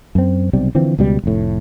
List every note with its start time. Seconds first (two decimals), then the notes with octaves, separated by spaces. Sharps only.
0.15 F#2 C4
0.53 B1 C3 G3
0.75 D3 E3 F3 C4
0.99 C#2 B2 G3
1.24 F1 A2